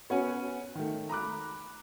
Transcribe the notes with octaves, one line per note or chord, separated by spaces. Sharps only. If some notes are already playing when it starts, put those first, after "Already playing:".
B3 C#4 F#4 C#5 F#5 G#5
D#3 A3
A#5 B5 D6 F#6